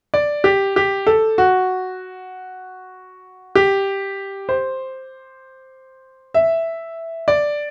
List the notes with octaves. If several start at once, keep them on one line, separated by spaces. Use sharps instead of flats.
D5
G4
G4
A4
F#4
G4
C5
E5
D5